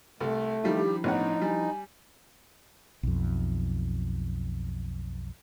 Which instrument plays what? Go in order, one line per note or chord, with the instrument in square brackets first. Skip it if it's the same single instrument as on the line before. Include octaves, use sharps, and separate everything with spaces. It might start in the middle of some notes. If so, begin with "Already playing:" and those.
[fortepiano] C2 A4 [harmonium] A3
[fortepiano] D#3 G3 F4 [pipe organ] F3 D4 E4 [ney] G4
[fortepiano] A1 C#4 F#5 [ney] B3 [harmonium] D#4
[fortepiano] G3 [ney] G#5
[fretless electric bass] B1 F2